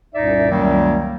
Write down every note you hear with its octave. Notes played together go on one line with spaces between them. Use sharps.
C2 F#2 A#2 D#4 D5 E5
C#2 F#2 D#3 F#3 G3 A#3